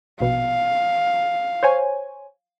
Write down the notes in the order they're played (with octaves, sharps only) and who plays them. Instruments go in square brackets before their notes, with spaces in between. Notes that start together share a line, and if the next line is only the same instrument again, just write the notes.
[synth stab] A#1 B2 [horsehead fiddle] F5
[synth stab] C5 C#5 G#5